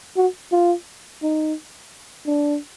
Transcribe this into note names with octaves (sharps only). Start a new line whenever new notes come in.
F#4
F4
D#4
D4